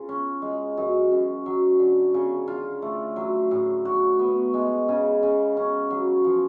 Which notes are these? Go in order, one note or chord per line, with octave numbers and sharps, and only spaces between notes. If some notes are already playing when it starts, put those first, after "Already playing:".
Already playing: C#3 F4
C#4
G#3
F#2
F#2
F#3
D3
C#3
F4
A3
F#3
A2
F#4
B3
G#3
C#3
C#3
C#4
F#3
F3